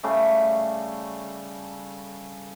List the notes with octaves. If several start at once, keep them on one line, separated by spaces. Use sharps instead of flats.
C#3 G3 A3